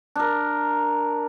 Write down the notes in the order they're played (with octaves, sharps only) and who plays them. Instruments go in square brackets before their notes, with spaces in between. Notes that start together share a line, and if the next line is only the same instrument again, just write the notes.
[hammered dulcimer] D4 A#4